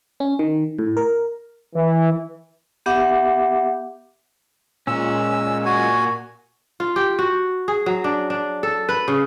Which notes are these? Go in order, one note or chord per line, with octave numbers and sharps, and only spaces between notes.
C#4
D#3
A2
A#4
E3
B3 G4 E5 F#5 D6
A#2 G#3 C#4 E6
F#4 G#5
F4
G4
F#4
G#4
F#3
D4
D4
A4
B4
C#3